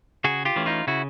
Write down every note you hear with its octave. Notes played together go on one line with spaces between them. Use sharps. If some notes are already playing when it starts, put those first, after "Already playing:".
C#3 F#4 G#4
F4 G4
E3 A3 C#4
D#4 F4
C#3 E4 F#4